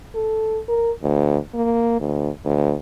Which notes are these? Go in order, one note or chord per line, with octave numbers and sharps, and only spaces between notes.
A4
A#4
D2
A#3
D2
D2